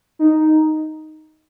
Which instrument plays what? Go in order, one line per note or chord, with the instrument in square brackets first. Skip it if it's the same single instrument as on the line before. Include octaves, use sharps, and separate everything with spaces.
[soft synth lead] D#4